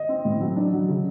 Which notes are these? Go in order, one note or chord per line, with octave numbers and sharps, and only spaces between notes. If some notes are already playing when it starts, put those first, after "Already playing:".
Already playing: D#5
C4
A2
F#3
D4
F#3
C#3